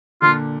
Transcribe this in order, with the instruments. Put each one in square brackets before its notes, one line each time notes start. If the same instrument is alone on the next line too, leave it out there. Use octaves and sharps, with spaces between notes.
[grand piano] A#2 D3 [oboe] F4